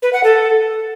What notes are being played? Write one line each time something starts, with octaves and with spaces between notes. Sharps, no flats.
B4
F#5
A4